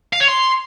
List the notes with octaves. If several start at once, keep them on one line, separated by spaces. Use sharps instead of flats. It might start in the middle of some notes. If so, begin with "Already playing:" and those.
F5
C#5
C6